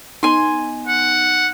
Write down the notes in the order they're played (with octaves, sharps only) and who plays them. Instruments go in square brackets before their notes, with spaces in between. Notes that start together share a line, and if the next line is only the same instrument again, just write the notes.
[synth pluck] B3 D#4 [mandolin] G#5 C6
[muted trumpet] F#5